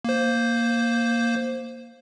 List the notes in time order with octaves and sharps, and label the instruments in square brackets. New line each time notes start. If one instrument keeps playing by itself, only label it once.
[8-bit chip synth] A#3 C5